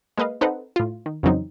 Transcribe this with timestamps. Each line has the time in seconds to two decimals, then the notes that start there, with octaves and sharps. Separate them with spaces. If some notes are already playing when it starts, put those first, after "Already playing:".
0.17 G#3 A#3 B4 D#5 F5
0.41 C4 D#4 A4 B4 C5 F#5
0.76 A2 F4
1.06 D#3
1.23 F2 C#3 E3 F#3 C4 D#4